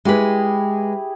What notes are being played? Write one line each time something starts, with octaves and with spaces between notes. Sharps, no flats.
G#3 E4 G4 G#4 B4